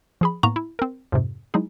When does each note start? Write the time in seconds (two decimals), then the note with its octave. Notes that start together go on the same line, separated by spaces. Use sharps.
0.21 F3 G#4 B5
0.43 A2 A#3 B3 B4 A#5 C#6
0.56 E4
0.79 C4 A#4
1.12 F2 G#2 C3
1.54 F#3 G#3 D#4 E4 G#4